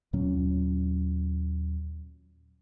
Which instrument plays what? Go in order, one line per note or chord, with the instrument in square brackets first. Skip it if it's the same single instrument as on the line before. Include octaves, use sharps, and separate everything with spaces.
[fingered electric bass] D#2 A#2 F#3 C#4